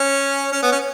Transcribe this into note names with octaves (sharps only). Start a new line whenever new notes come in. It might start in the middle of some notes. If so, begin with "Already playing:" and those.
Already playing: C#4
C#4
B3
C#4